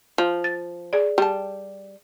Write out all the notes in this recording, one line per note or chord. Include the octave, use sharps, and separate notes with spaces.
F3
A6
G#4 D5
G3 A5